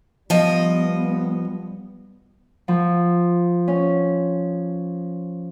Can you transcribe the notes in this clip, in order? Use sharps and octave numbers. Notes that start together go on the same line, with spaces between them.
F3 G3 B3 D#5
F3
C#4